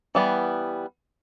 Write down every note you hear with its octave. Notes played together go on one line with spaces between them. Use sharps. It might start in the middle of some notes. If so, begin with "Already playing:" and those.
E3 G3 B3